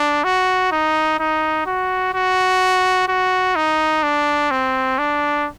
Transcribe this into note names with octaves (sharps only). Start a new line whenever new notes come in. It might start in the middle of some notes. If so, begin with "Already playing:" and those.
Already playing: D4
F#4
D#4
D#4
F#4
F#4
F#4
D#4
D4
C4
D4